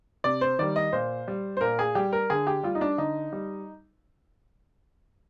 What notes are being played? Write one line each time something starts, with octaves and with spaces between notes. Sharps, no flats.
C3 D5
C5
D#3 G3 D5
D#5
A#2 C5
G3
C5
A#2 A#4
G#4
G3 G4
A#4
D3 G#4
G4
G3 F4
D#4
D4
D3 D#4
G3